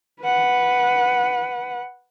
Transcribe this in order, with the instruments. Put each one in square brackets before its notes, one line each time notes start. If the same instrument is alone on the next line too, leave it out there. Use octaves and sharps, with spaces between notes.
[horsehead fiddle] B4 F#5